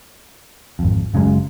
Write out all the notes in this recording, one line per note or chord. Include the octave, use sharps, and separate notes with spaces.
G#1 F2
F#1 C#3 F#3 G#3